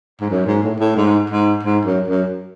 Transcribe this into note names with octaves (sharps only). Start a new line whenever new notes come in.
G#2
F#2
G#2
A2
A2
G#2
G#2
G#2
F#2
F#2